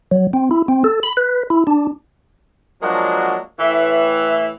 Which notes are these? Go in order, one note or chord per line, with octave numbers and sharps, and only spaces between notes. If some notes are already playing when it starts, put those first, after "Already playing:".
F#3
C4
E4
C4
A4
B5
B4
E4
D4
F3 F#3 G#3 A#3 D4 F#4
A2 E3 E5